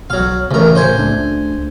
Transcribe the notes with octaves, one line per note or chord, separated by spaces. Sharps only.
B1 F#3 F5
A1 C#3 E3 A#4
A2 C#3 G#4 C5 G#5
C#2 A3 D4